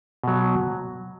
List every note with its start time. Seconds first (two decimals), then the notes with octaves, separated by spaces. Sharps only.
0.23 B2 F#3